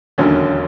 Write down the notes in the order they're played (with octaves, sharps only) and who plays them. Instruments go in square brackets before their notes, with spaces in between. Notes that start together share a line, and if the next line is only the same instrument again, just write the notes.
[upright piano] E1 D#2 D3 F#3 C#4